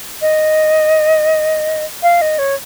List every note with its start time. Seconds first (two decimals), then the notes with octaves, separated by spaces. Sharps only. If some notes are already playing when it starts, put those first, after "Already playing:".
0.22 D#5
2.03 F5
2.22 D#5
2.39 C#5